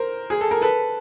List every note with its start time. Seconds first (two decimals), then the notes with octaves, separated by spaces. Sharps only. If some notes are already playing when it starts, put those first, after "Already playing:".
Already playing: A#4 C5
0.30 G#4
0.41 A4
0.51 A#4
0.61 A4 B4